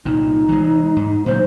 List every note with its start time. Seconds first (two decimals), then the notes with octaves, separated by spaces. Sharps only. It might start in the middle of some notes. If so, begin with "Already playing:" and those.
0.05 C2 A#2 D#4
0.48 E3 G#3
0.96 G#2
1.26 A#2 C#3 F#3 C5